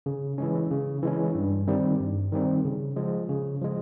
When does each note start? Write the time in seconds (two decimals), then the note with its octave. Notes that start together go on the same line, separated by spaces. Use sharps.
0.06 C#3
0.38 E3 G#3 C#4
0.71 C#3
1.03 E3 G#3 C#4
1.35 G2
1.68 D#3 G3 C4
2.00 G2
2.32 D#3 G3 C4
2.64 C#3
2.96 F3 G#3
3.29 C#3
3.61 F3 G#3